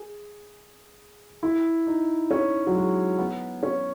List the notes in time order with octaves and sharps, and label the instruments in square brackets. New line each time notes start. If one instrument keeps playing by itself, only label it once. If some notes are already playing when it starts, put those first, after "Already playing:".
Already playing: [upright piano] G#4
E4
D#4
C#4
F#3
G#3
B3
C#4